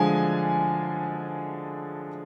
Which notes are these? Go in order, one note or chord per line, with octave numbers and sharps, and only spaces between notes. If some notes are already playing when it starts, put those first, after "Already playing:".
Already playing: D3 F3 G#3 G#5